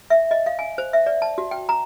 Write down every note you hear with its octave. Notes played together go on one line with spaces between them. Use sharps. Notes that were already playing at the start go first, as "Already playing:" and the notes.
E5
D#5
F5
G#5
C5
E5
D5
A5
F#4
G5
A#5